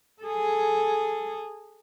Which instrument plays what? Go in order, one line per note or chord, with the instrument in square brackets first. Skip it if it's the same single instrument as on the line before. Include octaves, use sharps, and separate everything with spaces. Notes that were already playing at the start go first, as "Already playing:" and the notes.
[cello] G#4 A4